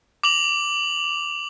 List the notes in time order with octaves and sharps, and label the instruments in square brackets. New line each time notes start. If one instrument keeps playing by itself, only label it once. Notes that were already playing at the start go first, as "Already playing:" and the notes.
[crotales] D6 F7 F#7